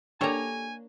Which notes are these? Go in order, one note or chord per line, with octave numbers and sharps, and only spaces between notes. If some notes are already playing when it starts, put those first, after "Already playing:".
A#3 D4 G4 A4 C#5 G#5 A#5